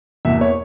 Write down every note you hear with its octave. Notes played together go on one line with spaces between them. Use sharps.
E2 B2 A#3 E5
C#5